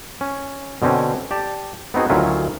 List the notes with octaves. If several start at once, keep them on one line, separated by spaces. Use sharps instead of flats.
C#4
B2 D3 C4 C#4
G4 D5 A5
B3 C4 D#4 F#4 G#4
D2 D#3 F#3 C#4 E4 F4